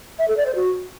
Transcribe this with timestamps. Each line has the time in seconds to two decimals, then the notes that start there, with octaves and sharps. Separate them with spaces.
0.19 E5
0.28 A4
0.37 D5
0.46 C5
0.55 F#4